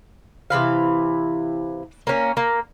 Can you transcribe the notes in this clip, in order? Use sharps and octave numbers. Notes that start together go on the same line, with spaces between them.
C3 E3 E4 F5
A#3 C#4
A#3